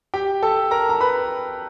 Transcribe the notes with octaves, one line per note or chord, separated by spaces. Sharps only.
G4 G5
A4 A5
A#4 A#5
A#5
B4 B5